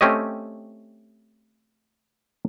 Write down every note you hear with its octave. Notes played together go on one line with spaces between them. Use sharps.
A3 C4 C#4 G4 C#5 D#5